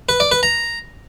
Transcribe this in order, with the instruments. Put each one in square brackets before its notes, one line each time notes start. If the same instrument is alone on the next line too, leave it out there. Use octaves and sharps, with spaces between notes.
[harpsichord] B4
D5
B4
A#5